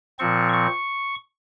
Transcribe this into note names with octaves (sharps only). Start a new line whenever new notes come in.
A#2 F3 C4 C#6
C#6